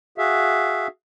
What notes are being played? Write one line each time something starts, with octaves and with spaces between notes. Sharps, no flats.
F#4 G#4 E5 F5